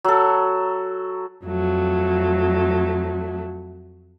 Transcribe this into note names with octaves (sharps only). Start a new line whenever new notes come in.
F#3 A4
F2 F#3 A3